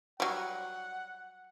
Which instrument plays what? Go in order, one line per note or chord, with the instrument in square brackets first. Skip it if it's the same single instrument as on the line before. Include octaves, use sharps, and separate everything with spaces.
[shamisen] F#3 G3 [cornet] F#5